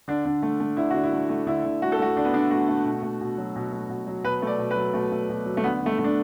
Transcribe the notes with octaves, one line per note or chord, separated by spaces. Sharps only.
D3 D4
D3
A3
A3
D3 E4
D3 F#4
E4
A3
A3
D3 E4
D3
A3 F#4
A4
A3 F#4
D3 D4
B3
D3 D4
A3 F#4
A3
B2
A3
B2
F#3
B2
A3
B2
F#3
B2 B4
A3 D5
B2
B4
F#3
B2 A3
A3
B2
F#3
A3
D3 B3
D3
A3
A3
D4